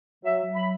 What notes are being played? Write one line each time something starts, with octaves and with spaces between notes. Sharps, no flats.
F#3 E5
F#3
B5